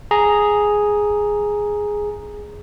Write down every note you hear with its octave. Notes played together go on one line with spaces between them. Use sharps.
G#4 A#5